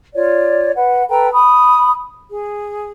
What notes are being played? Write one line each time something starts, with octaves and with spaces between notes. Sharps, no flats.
F4 C#5 D5
B4 F#5
A4 B4 G5 A#5
B5 D#6
G#4